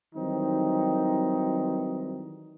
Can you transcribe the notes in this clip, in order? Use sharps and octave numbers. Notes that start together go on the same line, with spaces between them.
D#3 E3 F#3 G3 C4 D#4